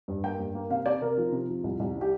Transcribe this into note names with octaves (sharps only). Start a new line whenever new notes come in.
G2
A#3 G5
G2
A#3
C3 F5
C3 D5
C3 A#4
F3
C3
F3
C2
C2
C3
G4